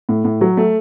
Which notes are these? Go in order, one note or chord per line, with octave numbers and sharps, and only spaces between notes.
A2
A2
F#3
A3